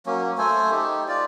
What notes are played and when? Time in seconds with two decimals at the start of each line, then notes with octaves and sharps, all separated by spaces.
0.06 F#3 A#3 C#4
0.38 A3 A4 C5 G#5
0.71 D#4 G4
1.08 F4 D5